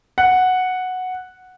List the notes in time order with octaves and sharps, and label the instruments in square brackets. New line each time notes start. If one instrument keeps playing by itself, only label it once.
[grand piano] F#5